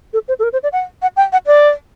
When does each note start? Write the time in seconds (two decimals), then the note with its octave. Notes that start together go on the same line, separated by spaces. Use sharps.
0.13 A4
0.28 C5
0.39 A4
0.43 A#4
0.53 C5
0.63 D5
0.72 F#5
1.02 F#5
1.17 G5
1.33 F#5
1.47 D5